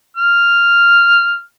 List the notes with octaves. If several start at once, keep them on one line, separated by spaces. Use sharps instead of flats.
F6